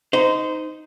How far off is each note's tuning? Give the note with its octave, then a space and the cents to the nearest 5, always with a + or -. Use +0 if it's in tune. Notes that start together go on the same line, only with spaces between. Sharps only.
D#4 +5 C5 -25